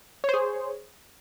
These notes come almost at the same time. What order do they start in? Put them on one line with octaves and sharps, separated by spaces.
C#5 C5 G#4